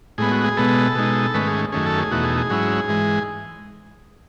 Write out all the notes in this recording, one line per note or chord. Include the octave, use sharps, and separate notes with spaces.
A2 G#3 B3 G#4
F#4
G#4
B2 G#3 B3 A4
B2 G#3 D#4
G#2 D#3 A3 C#4 B4
G#4
F#2 D#3 A3 C#4 G#4
A4
G#4
E2 B2 A3 D#4 F#4
G#4
G#4
G#2 F#3 C#4 E4
G#2 E3 G#3